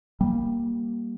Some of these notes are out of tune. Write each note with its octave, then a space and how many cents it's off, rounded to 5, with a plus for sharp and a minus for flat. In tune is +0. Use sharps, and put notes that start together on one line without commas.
G3 +0 A#3 +5